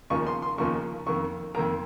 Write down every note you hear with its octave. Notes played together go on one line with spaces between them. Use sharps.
D#2 C#3 F3 A#3 C#6
C6
C6
D#2 C#3 F3 A#3 C#6
F2 D#3 A#3 C#6
F2 D#3 A#3 A#5